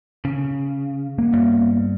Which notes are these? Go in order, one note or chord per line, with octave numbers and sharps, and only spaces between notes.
C#3
A#3 B3
G2